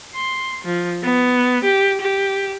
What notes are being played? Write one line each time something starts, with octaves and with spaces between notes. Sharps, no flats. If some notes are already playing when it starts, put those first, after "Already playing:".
C6
F3
B3
G4
G4